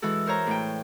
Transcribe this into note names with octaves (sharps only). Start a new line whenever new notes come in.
E3 G#3 F#4 A4
A#4 C5 C#5 A#5
A2 G5